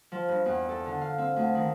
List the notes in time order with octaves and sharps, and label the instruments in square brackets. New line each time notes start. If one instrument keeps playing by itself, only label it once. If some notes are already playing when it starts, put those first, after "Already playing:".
[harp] F3
G2
E2
A4
D3
F5
C4
D2
D#3